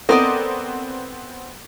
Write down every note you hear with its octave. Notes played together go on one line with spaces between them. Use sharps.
B3 C4 A4 A#4 D5 D#5 D#6